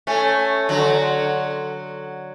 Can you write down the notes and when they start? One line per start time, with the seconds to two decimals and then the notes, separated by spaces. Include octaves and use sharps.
0.07 A3 C#4
0.69 D3 F#3